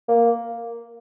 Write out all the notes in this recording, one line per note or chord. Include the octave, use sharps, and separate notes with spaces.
A#3